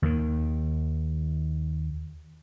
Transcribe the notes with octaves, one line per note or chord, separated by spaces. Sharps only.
D#2 D#3